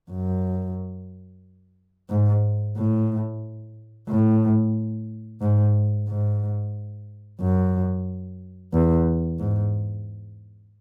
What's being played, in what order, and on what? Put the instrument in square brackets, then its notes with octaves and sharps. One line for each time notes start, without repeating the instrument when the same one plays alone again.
[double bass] F#2
G#2
A2
A2
G#2
G#2
F#2
E2
G#2